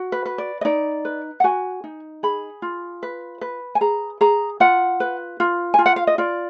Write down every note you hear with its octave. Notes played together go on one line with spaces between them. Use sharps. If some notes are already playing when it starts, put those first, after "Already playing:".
Already playing: F#4
B4
B4
D5
D#5
D#4 D5
B4
F#5
F#4 G#5
D#4
G#4 B5
F4
B4
B4
G#5
G#4 A#5
G#4 A#5
F4 F#5
B4
F4
F4 G#5
F#5
F5
D#5
F4 D5